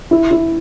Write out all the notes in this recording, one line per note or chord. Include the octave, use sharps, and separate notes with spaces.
E4
E4